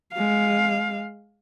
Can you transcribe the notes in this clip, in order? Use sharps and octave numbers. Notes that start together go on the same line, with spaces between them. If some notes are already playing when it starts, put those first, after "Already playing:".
G#3 F5